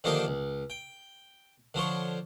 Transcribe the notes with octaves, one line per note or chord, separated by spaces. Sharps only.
D3 D#3 F3 A#3 D#4 G4
C#2
G5
D3 F3 C5 C#5